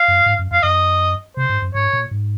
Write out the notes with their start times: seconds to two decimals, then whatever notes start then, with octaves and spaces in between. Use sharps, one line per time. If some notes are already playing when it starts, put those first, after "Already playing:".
Already playing: F5
0.08 F#2
0.26 G#2
0.39 F#2
0.51 F2 F5
0.63 F#2 D#5
1.37 C3 C5
1.49 G#2
1.62 F#2
1.74 G#2 C#5
1.93 A#2
2.11 G#2